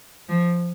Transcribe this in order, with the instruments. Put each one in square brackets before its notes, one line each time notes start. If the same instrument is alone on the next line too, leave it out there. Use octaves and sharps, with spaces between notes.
[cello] F3